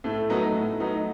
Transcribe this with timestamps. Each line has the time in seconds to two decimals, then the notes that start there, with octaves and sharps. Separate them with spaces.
0.04 A2 A3
0.30 F#3 B3 D#4
0.55 A2
0.80 F#3 B3 D#4